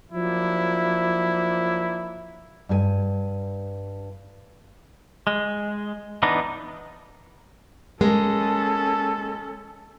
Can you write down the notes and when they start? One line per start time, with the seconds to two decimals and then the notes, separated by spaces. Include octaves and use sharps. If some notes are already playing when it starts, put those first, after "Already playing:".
0.12 F3 F#3 A#3 D4 E4
2.69 G2 G#4 G#5
5.27 G#3
6.23 E3 B3 D4 D#4
8.01 G#3 A#3 C#4 A4